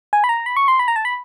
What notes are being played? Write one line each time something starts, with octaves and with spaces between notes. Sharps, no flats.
G#5
B5
A#5
B5
C#6
C6
B5
A#5
A5
B5